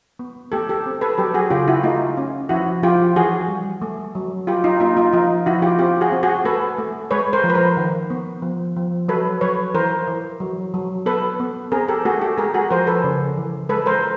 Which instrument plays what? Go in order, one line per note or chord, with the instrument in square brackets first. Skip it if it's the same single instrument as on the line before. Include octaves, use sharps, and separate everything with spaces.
[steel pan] B3
A3 G4 A4
G4 A4
C4
A4 B4
F#3 G4 A4
F#4 G#4
C#3 F4 G4
E4 F#4
A3 D#4 F4
C#4
F3 E4 F#4
F3 F4 G4
E3 F#4 G#4
G3
A3
F#3
F#3 F4 G4
D#4 F4
A#3 D#4 F4
D#4 F4
F3 D#4 F4
F3 E4 F#4
F4 G4
C4 F4 G4
F#4 G#4
C4
F#4 G#4
A3 A4 B4
A3
G#3 B4 C#5
A#4 C5
F3
B4
A#4 C5
D#3
B3
F3
F3
F#3 A4 B4
F#3 B4 C#5
E3 A#4 C5
E3
F#3
F#3
B3 A4 B4
B3
C4 G#4 A#4
G4 A4
A3 F#4 G#4
G4 A4
G#3 G#4 A#4
F#4 G#4
F3 A#4 C5
A4 B4
C#3
E3
G#3 A4 B4
A#4 C5